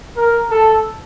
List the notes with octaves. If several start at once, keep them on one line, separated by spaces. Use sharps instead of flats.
A#4
A4